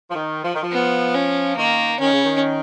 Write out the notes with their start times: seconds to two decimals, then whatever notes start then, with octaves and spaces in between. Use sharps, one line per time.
0.11 F3
0.15 D#3
0.43 F3
0.54 D#3
0.62 F3
0.72 B3
1.15 C#4
1.57 D#3 A#3
2.00 D#3 C#4
2.12 C#3
2.24 D#3